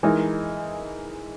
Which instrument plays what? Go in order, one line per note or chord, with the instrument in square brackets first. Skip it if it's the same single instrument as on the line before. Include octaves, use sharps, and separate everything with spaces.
[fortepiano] E3 G#3 D#4 A#4